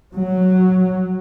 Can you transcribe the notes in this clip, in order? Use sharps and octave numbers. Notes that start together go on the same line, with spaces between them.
F#3